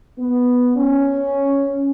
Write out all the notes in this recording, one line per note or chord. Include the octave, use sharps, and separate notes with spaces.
B3
C#4